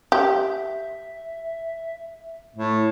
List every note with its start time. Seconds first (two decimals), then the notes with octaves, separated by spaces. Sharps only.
0.12 G4 E5
2.56 A2